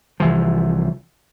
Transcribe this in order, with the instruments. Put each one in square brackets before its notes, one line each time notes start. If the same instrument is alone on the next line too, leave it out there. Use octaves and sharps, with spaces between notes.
[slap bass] C2 E3 F3